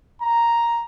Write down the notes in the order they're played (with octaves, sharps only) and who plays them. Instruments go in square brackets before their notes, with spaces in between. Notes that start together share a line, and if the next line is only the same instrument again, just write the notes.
[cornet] A#5